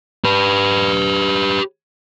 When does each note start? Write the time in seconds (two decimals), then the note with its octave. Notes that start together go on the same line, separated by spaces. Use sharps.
0.24 G4 B4